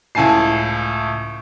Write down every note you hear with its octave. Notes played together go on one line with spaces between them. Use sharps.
C#2 A2 G#5 A5 C7